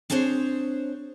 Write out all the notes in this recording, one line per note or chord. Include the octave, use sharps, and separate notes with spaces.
C4 D4 G#4 C5 C#5